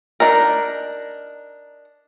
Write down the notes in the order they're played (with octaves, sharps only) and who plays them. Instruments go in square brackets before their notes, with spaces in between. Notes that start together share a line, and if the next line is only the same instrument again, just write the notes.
[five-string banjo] D4 D#4 A#4